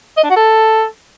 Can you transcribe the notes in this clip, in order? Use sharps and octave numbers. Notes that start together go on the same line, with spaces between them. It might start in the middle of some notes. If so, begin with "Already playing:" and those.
D#5
D4
F#4
A4